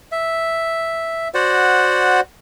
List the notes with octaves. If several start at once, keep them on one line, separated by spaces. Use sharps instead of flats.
E5
F#4 C5 D5 F#5